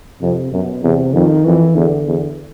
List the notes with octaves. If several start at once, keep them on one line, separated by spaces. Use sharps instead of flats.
F2 C3
F#2 B2
E2 C3
F2 D#3
F2 E3
E2 D3
E2